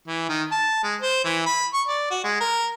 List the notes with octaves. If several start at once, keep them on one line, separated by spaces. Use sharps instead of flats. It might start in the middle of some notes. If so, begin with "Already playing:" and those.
E3
D#3
A5
G#3
C5
E3
B5
C#6
D5
F#4
G#3
A#4